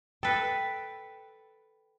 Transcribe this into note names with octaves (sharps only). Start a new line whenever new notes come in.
A4 B4 G5